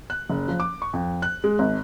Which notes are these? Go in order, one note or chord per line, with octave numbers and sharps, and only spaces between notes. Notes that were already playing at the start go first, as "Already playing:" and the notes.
F#6
F#1
F3
D6
C#6
F2
F#6
G#3
G#1